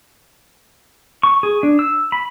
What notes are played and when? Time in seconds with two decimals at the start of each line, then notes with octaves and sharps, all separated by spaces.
1.23 C#6
1.43 G#4
1.63 D4
1.79 E6
2.12 B5